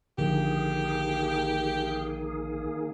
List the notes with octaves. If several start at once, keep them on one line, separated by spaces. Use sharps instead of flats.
A#1 D3 D#3 F3 A#3 G4 G#4